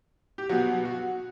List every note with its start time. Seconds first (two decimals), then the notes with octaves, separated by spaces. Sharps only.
0.38 G4
0.49 B2 F#3 F#4
0.85 F#4